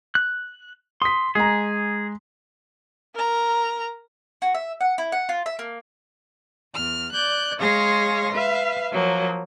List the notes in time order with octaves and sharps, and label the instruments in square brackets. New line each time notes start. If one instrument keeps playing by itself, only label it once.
[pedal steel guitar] F#6
[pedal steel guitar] C6 [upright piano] D#6 B6
[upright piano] G#3 A#5 [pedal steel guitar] G#4
[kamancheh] A#4 A#5
[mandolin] F#4
E5
F#5
E4
F#5
F4
E5
A#3
[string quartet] E2 F6
D5 F#6 G6
G#3 G#4 C#5 F5 C6 A#6
B4 E5 F5
F3 F#3 A#3